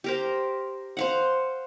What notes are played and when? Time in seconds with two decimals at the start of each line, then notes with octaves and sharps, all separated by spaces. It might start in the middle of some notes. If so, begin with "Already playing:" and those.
0.04 G4 A#4 C5
0.97 C5 F5 F#5